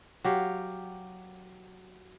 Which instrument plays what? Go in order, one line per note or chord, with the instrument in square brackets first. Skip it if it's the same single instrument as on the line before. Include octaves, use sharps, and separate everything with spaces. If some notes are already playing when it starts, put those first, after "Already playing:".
[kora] F#3 G4 F5